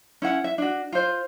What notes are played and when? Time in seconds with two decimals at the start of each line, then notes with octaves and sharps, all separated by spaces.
0.22 C#4 E4 F#5
0.44 E5
0.58 D4 F#4
0.92 F4 C5